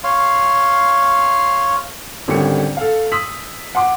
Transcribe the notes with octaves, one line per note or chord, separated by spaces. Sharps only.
C#5 F5 C6
G#1 D3 G3 C#4 C#7
A4 F5
C6 D#6 E6 B6 F#7
F#5 C6 D6